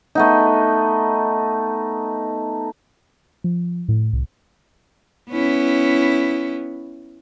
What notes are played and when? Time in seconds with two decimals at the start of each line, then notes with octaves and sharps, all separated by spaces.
0.15 A3 B3 D#4
3.44 F3
3.88 A2
4.13 C2
5.30 B3 C#4 E4